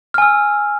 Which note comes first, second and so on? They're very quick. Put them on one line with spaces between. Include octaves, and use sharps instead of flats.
F6 G#5 E6